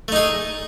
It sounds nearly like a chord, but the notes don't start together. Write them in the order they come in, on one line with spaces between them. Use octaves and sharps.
A3 D#4 G#4